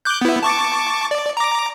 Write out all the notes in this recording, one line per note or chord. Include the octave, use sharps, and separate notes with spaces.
D6 F#6 G6
B3 E4
A5 C#6 D6
D5
A#5 D6